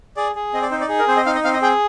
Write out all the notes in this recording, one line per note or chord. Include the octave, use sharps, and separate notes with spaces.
G#4 D5
G#4
C4 D#5
D5
D#4 C5
D5
G#4
A#4
C4 C5
D#5
D#4 F5
D#5
C4 F5
D#5
G#4 G5